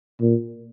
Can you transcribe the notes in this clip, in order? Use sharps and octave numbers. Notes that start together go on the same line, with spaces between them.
A#2